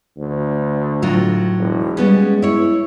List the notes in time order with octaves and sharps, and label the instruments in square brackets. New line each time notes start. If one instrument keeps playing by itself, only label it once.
[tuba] D2
[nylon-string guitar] A2 F#3 F4
[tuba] E1
[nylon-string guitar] G3 B3 C#4 [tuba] G#3
[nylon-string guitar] E4 C#5